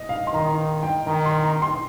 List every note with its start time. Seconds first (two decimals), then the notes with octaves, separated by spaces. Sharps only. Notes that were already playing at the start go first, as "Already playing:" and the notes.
Already playing: D#5
0.09 F5
0.27 C6
0.33 D#3 A#5
0.83 G5
1.07 D#3 A#5
1.26 C6
1.43 A#5
1.62 C6